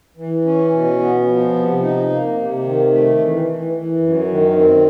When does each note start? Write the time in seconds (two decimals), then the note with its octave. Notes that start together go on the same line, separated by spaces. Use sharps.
0.17 E3
0.45 C#4
0.72 B2
0.99 B3
1.26 F3
1.54 C3
1.82 D#4
2.09 A#3
2.37 C3
2.64 D#3
2.91 A3
3.18 E3
3.46 E3
3.73 E3
4.00 F#2
4.28 D#3
4.55 C4